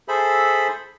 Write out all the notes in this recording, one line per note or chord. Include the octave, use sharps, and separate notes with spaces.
G#4 A4 C5 E5 B5